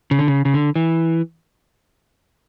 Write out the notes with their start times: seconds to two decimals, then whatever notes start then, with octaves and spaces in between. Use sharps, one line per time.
0.11 C#3
0.19 D3
0.28 C#3
0.45 C#3
0.54 D3
0.75 E3